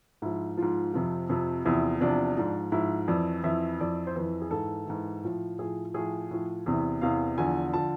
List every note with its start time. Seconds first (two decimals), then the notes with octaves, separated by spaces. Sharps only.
0.22 G#2 F3 E4
0.57 G#2 F3 F4
0.94 F2 C3 F3
1.29 F2 C3 F3
1.65 E2 C3 F3 E4
2.01 E2 C3 F3 D4
2.37 G#2 F3
2.72 G#2 F3 E4
3.08 F2 E3 D5
3.44 F2 E3 E5
3.80 F2 E3 D5
4.07 C5
4.16 F2 E3 B4
4.42 G#4
4.51 G#2 E3 A4
4.87 G#2 E3
5.24 A2 F3
5.58 A2 F3 G#4
5.94 A2 F3 G#4
6.31 A2 F3
6.66 E2 C3 E3
7.01 E2 C3 E3 F5
7.38 E2 D3 F3 G#5
7.74 D3 F3 A5